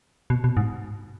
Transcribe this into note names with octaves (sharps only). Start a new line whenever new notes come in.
B2
B2
G#2